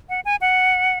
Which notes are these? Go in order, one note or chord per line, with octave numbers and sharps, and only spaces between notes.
F#5
G#5
F#5